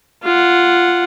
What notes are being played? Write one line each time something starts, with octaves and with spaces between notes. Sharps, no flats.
F4 F#5